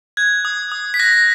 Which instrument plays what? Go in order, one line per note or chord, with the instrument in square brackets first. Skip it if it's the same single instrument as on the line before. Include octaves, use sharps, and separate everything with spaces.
[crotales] F#6 G#6
D#6
D#6
B6
F#6 A#6